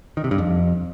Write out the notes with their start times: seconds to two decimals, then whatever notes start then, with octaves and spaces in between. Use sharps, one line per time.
0.17 D#3
0.24 C3
0.31 G2
0.38 F2